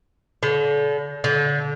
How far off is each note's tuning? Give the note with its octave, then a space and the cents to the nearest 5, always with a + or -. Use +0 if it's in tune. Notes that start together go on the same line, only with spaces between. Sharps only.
D3 -40
D3 -30